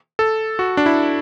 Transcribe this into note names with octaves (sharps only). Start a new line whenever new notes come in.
A4
F#4
D4
E4